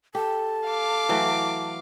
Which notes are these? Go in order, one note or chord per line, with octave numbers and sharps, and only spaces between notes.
G4 A4 A5
F5 D6
E3 F#3 A3